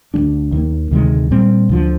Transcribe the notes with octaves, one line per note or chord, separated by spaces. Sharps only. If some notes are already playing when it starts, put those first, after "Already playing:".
D2 D3 G3 D4
D#2 D#3 A#3
D2 C3 D#3 G#3
A#2 G3 C4
D2 D3 F3